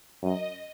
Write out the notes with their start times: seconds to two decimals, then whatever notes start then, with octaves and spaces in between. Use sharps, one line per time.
0.23 F#2 D#5